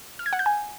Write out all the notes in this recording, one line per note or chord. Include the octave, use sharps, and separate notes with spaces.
F6
G#6
F#5
G6
G#5